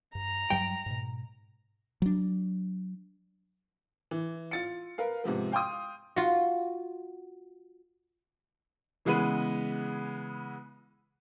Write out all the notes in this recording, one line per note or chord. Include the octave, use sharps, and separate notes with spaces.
G2 A#5
G2 F#3 G3 G5
G#2 B2
F#3 D4
E3
F4 A6 C#7
A#4 B4 F5
G#2 C3 F3 B3
F5 G5 C6 D#6
F4 F#4
C#3 E3 G#3 B3 B5 D#7